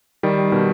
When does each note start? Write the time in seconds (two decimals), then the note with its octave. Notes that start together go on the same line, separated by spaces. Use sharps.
0.23 D#3 G3
0.52 B2 D#3